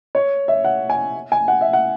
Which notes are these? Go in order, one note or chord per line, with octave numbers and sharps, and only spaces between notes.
C#5
E5
F#5
G#5
G#5
F#5
E5
F#5